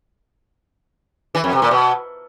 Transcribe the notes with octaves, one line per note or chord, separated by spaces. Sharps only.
E3
F2
C3
A#2
B2